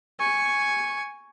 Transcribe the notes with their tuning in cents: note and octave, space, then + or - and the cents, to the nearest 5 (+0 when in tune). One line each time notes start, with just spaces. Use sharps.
G#5 +0 C#6 +0